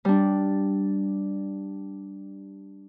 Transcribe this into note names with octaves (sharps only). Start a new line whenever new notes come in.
G3 D4